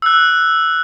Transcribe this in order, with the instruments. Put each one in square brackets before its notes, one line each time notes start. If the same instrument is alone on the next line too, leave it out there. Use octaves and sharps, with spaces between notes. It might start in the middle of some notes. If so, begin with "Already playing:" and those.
[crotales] E6 F#6